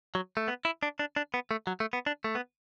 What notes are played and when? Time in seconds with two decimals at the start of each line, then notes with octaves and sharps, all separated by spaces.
0.15 F#3
0.37 A3
0.48 B3
0.65 E4
0.83 D4
0.99 D4
1.16 D4
1.34 B3
1.51 A3
1.67 F#3
1.80 A3
1.93 B3
2.06 D4
2.24 A3
2.35 B3